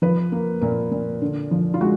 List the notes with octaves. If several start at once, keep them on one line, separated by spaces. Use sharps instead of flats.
F3 B4
A#3
A#2 A#4
A#2
D3
F3
F4
G#3 F#4